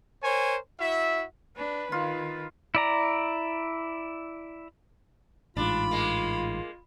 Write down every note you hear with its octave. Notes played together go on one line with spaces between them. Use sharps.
A#4 C5 C#5 G#5
E4 F#4 E5
D4 B4
D#3 F4
E4 D5 A#5
A1 G#2 D4 F4 B5
G#3 A#3